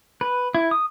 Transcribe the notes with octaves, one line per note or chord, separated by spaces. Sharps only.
B4
E4
D#6